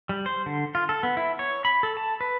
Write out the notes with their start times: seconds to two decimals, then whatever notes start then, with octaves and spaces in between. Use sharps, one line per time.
0.09 G3
0.26 C5
0.46 D3
0.75 F4
0.89 A4
1.03 B3
1.17 E4
1.39 C#5
1.65 B5
1.83 A4
1.97 A5
2.21 B4